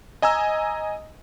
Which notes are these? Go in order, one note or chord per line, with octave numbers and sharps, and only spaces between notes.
D#5 G#5 A#5 E6